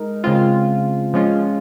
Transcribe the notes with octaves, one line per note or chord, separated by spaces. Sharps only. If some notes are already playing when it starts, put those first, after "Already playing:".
Already playing: G#3 D#4 A#4
C#3 G#3 C4 F4
F3 G#3 C#4 F4